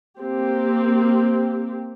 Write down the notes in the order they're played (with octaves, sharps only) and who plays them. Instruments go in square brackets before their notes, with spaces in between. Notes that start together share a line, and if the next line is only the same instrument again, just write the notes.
[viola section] A#3 C4 G4